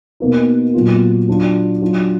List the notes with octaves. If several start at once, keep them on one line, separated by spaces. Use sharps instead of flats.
B2 A#3 D#4
A#2 F#3 B3 F4
F#3 D4 F4
F#3 D4 F4